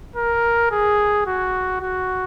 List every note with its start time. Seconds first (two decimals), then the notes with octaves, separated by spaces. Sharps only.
0.16 A#4
0.71 G#4
1.27 F#4
1.82 F#4